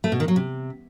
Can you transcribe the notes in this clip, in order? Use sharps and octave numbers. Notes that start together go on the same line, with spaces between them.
A3
B2
D#3
F#3
C3